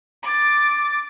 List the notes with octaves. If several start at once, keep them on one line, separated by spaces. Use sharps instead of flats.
D6 A6